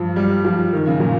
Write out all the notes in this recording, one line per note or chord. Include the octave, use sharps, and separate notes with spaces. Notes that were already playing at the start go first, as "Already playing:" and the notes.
Already playing: G2 F3
G3
F3
D#3
C#3
A#2